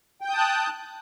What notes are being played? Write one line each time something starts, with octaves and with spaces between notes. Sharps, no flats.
G5 A5 D#6 F#6 G6